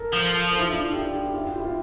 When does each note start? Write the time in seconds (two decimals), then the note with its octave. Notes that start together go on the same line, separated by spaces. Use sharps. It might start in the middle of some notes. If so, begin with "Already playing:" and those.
Already playing: A4 A#4
0.13 F3
0.52 A4
0.59 E4
0.62 F4
0.72 D4
0.83 E4
0.93 G4
1.04 A4
1.13 G4
1.23 G4
1.33 F4
1.44 F4
1.54 G4
1.60 E4
1.65 F4